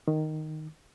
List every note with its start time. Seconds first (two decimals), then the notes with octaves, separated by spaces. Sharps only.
0.08 D#3